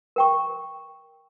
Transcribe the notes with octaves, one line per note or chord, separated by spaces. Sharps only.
A#4 G5 C#6